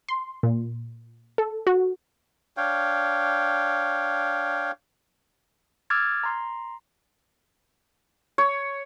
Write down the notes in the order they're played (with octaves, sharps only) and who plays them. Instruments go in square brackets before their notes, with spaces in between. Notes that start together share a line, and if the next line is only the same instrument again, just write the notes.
[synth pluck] C6
A#2
A4
F#4
[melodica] D4 C#5 F5 G5
[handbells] D6 E6 F6 G#6 A6
A#5 C6
[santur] C#5